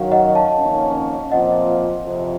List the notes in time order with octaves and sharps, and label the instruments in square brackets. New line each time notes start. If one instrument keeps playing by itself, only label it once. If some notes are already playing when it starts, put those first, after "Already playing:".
Already playing: [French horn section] F#2 D#3 F#3 [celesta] C#5 F5
[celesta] D#5 F#5
F5 A5
[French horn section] F2 D#3 A#3 C#4
[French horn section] A#2 F3 C4 F4 [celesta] D#5 F#5
[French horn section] F2 C3 F3